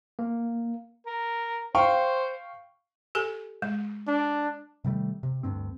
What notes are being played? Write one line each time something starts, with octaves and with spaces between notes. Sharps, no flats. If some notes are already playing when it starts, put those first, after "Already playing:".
A#3
A#4
C5 F5 G5 C#6
G4 A4 G#5
G#3
D4
C3 D#3 G3 A3
C3
D2 G2 C4